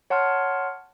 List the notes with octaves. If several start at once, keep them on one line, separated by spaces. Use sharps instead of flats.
C#5 F#5 A5 C6 F6